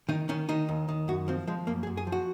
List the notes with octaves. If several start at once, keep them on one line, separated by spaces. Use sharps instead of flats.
D#3 D#4
D#3 C#4
D#3 D#4
D#2
D#3
F#2 F#4
F3 C4
F3 G#3
F#2 A#3
G#4
F#2
G#4
F3
F#4